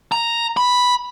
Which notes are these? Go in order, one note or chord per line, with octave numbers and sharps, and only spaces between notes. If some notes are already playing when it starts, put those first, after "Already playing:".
A#5
B5